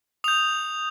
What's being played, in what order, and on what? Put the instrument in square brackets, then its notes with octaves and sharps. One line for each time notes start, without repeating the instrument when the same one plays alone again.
[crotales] D#6 G6 F7